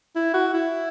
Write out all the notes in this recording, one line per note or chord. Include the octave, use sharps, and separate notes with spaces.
E4
F#4
E4